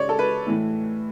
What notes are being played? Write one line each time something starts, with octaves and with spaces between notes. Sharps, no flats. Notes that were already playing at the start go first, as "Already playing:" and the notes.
Already playing: C#3 G#3 C#5 D5
A4
B4
A2 E3 A3